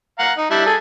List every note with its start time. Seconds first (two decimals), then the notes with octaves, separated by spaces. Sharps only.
0.19 F5 F#5 A#5
0.37 D#4
0.51 G3 D4 E4
0.66 G#4 A4